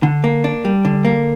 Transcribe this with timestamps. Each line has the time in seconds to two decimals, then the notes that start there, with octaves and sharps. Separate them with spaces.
0.03 D3
0.24 A#3
0.44 D4
0.65 G3
0.85 D3
1.05 A#3